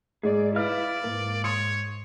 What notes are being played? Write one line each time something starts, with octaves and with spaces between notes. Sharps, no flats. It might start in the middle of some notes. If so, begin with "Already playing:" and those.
G#2 G#4 D5
E4 B4 D5 F5 F6
G#2 A#3
C#5 C6 D#6 C#7